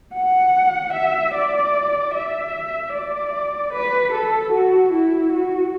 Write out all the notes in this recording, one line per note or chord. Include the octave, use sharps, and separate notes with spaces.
F#5
E5
D5
E5
D5
B4
A4
F#4
E4
F#4